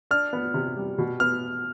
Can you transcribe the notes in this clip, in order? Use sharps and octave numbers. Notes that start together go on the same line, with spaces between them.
D4 F6
B3
C3
G3
B2
B3 F6